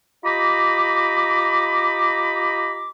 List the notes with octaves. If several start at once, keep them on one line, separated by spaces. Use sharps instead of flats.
F4 G4 D#5 A#5 B5 D6